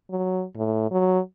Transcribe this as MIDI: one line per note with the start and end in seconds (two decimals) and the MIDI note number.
0.10 0.44 54
0.56 0.90 45
0.91 1.19 54